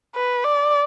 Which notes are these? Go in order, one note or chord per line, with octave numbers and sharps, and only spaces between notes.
B4
D5